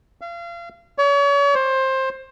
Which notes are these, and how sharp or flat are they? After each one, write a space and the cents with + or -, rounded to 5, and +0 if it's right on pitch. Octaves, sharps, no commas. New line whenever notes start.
F5 -35
C#5 +40
C5 +20